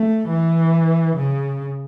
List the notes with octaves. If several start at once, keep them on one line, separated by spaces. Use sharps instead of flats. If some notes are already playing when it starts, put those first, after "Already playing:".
Already playing: A3
E3
C#3